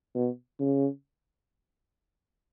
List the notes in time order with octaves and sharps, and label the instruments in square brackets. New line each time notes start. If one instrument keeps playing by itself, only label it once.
[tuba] B2
C#3